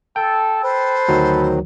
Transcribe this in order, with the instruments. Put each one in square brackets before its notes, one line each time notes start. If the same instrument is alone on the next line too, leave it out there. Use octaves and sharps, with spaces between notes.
[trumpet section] A4 [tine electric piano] G5
[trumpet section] A4 B4 [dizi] C5
[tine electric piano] D2 D#3 F#3